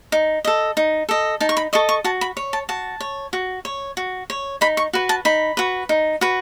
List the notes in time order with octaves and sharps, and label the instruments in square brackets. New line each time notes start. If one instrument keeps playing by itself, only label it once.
[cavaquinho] D#4
A4 D#5
D#4
A4 D#5
D#4 A5
C#6
B5
A4 D#5 C#6
C#6
F#4 A5
B5
C#5
A5
F#4 A5
C#5
F#4
C#5
F#4
C#5
D#4 B5
C#6
F#4 B4
A5
D#4 B5
F#4 B4
D#4
F#4 B4